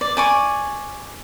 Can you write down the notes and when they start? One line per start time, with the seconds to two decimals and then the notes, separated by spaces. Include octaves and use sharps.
0.01 D5
0.17 D5 G#5 C#6